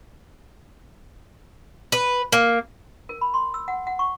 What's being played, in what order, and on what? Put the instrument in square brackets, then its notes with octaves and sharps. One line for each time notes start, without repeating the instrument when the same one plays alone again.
[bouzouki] B4
A#3
[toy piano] A#4
B5
C6
E6
F#5
F#5
C#6